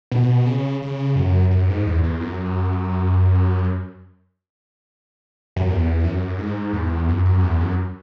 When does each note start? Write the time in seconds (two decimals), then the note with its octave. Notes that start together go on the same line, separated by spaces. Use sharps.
0.12 B2
0.46 C#3
0.82 C#3
1.16 F#2
1.50 F#2
1.69 G#2
1.86 E2
2.03 E2
2.21 F#2
5.56 F#2
5.69 E2
6.04 F#2
6.38 G#2
6.73 E2
7.08 F#2
7.25 F#2
7.43 E2
7.61 F#2